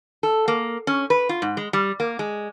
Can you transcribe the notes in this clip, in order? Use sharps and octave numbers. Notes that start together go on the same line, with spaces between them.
A4
A#3
C#4
B4
F4
G#2
G#3
G3
A#3
G#3